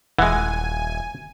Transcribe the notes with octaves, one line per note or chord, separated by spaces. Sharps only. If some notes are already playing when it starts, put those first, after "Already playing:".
D#1 E3 G#3 F#5 G#5